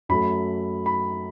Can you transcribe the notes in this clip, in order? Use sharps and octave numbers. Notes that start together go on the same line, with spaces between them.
F#2 F#3 A3 B5
B5